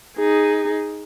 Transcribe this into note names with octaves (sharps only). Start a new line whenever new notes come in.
D#4 G#4